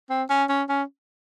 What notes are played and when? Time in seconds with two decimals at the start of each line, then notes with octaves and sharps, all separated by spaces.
0.10 C4
0.30 C#4
0.50 C#4
0.69 C#4